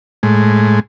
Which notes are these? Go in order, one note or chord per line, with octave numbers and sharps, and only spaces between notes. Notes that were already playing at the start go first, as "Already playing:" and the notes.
A2 G#3